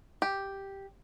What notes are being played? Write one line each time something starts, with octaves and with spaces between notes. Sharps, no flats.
G4